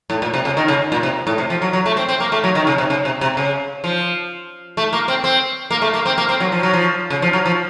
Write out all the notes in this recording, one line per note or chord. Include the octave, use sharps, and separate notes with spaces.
A2
A#2
C3
C#3
D#3
C#3
A#2
C3
A2
C3
F3
F#3
F#3
A3
C4
C4
A#3
A3
F#3
D#3
C#3
C3
C#3
C3
C3
C#3
F3
A3
A#3
C4
C4
A#3
A3
A#3
C4
A#3
C4
F#3
F3
F#3
F3
C#3
F3
F#3
F3